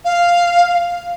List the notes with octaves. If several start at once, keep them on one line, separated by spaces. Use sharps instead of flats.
F5